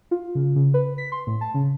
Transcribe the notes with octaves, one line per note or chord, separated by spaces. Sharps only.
F4
C#3
C#3
B4
B6
C6
A2
A5
C#3